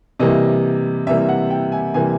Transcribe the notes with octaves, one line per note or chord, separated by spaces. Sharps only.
C3 E3 G3 A#3 D#5
C3 E3 G3 A#3 E5
F#5
G5
G#5
C3 E3 G3 A#3 G#5